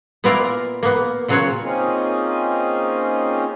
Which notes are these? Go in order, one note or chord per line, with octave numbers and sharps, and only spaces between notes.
A#2 B3 E4 F4 A#4 D5
A#3 B3
A#2 C#3 F#3 F4 F#4 C#5
A#3 C4 C#4 D#4 F4 G#4